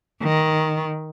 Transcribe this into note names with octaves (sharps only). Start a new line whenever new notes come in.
D#3